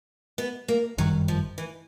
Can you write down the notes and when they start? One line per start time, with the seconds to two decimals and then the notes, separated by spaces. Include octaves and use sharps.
0.38 B3
0.68 A#3
0.98 G1 F#2 D#3 F#3 G3
1.28 F3
1.58 E3